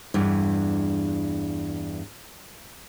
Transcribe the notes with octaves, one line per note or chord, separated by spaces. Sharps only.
E2 G2